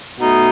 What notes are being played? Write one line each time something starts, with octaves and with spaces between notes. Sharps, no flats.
B2 A3 D#4